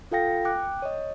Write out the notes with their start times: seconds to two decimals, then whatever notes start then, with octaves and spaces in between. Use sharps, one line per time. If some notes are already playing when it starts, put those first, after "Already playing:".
0.12 F4 A4 F5 G5 A#6
0.45 G5 D6 F#6
0.82 C#5 D#5